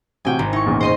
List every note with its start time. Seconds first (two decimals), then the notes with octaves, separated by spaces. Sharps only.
0.25 A1 C3 F#4 G5 G#5
0.39 G#1 A#5
0.53 D#4 E4 C#6
0.66 E2 A#2 C#3
0.81 C5 D#5 C6